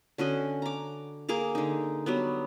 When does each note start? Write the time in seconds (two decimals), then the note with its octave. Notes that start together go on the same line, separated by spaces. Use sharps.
0.18 D3 C#4 F#4 D#5
0.62 A#5 D6
1.29 A#3 G#4 A#5 D6
1.55 D3 D#4
2.06 F#3 G3 B3